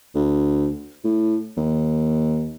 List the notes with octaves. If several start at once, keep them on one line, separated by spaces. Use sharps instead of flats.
D2
A2
D#2